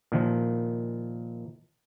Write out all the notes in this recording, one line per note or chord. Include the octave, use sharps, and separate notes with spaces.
A#2 D#3 F3